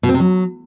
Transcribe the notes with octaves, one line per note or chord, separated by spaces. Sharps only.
B2
C4
C3
F#3